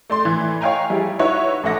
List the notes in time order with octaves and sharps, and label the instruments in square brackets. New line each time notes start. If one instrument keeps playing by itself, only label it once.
[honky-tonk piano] A3 D5 C6
A2 E3
C#5 D#5 F5 G5 G#5 A#5
G3 E4 G#4
D#4 E4 F#4 B4 C#5 E5
A1 A4 E5 F#5 A#6